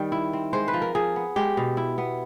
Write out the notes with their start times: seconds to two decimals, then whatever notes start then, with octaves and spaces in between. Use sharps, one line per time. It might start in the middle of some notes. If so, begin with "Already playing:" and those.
Already playing: D#3 G3
0.12 E4
0.33 C4
0.53 G#3 C5
0.68 B4
0.74 F3
0.82 A#4
0.95 F3 G#4
1.16 B3
1.36 G#3 G4
1.57 B2
1.77 E4
1.98 B3